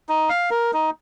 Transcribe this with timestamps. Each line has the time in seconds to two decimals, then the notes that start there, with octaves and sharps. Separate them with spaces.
0.09 D#4
0.29 F5
0.51 A#4
0.73 D#4